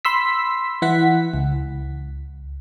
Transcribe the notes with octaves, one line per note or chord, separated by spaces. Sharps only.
B5 C6 E6 B6
E3 E4 F#5 B6
C#2